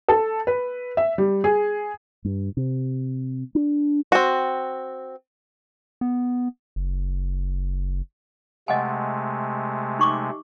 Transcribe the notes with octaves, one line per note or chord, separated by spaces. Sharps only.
A4
B4
E5
G3
G#4
G2
C3
D4
C4 F#4
B3
F#1
C3 G#3 A3 D#5 F#5 G#5
D#4 C#6 D6